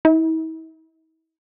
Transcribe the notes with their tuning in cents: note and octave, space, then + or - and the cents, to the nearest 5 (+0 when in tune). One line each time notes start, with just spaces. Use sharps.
E4 -45